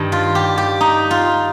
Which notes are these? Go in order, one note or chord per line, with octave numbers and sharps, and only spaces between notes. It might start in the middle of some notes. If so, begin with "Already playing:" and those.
Already playing: G2 D#3 G3
F4
G4
G4
D#4
F4